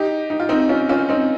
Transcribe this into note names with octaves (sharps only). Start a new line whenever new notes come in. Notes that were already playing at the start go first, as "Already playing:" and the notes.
Already playing: D#4 G4
D#4
F4
C4 D#4
C#4 F4
C#4 F4
C4 D#4